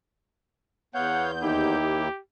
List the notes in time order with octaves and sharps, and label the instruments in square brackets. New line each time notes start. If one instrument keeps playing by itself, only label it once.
[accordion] E2 G6 [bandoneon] B3 C#5 F5 [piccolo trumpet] F#5
[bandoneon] D#2 A#3 E4 [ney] D#4 [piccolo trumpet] G4